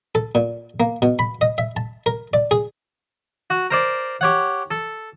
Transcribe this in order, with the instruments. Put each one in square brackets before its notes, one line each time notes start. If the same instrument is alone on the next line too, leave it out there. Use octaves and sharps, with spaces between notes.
[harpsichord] A4
A#2
A#3
B2
B5
D#5
E5
A5
A#4
D5
G#4
F#4
A#4 C5 D5
G4 C#5 F#5
A4